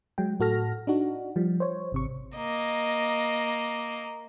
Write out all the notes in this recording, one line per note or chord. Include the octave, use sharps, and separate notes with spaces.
F#3 G#3 G5
A2 F#4 A4 F6 A#6
D4 D#4 F#4
F3 G3
C5 C#5
G#1 C3 C#6
A#3 D#5